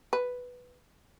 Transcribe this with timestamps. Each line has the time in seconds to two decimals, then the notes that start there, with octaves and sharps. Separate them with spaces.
0.13 B4